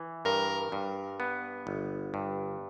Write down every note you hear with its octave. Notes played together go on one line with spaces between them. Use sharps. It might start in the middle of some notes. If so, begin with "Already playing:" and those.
Already playing: E3
G2 A#4
G2
B3
G1
G2